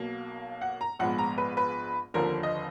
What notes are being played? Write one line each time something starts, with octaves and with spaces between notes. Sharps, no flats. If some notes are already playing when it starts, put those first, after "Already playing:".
Already playing: B1 B2 A#3
F#5
A#5
A#1 G#2 F3 G#3 B3 F#5
A#5
B4
B4
F1 D#2 D3 F3 A#3 A#4
D#5